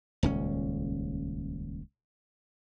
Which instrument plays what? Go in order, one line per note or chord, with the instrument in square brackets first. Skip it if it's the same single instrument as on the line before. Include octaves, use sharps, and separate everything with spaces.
[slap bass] D#1 C#2 C#4